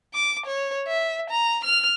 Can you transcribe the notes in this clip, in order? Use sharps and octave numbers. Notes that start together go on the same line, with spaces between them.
D6
C#5
E5
A#5
F6